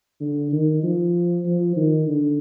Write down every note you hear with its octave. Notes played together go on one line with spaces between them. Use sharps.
D3
D#3
F3
F3
D#3
D3